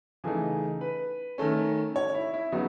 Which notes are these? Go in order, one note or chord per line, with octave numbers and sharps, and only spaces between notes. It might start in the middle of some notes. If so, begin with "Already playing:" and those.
C#3 E3 A3 D#4 G#4
B4
D#3 A3 C#4
C#5
E4
E4
C#3 F#3 B3 D#4 F#4